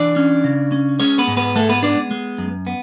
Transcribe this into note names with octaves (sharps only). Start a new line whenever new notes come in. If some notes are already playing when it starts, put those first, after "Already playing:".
Already playing: E3 D4 D5
C#4
C#3
C#4
G#3 C#4 C#5
B3 B4
G#2
B3 B4
G#3 A3 A4
B3 B4
B3 D4 D5
G#3
F#2
B3